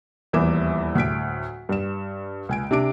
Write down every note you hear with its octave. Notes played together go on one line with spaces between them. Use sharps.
D#1 E2 E3 D6 E7
D2 A2 B6 D7
G2 E7
C#2 G#5 D7
C3 D4 D6 D7